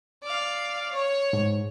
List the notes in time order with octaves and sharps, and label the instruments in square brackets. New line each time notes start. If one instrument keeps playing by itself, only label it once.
[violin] D5 F5
C#5
[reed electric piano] G#2